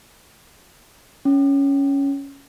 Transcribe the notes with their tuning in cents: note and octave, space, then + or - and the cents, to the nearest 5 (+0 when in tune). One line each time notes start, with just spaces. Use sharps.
C#4 +5